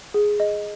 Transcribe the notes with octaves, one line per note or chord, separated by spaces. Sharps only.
G#4
D#5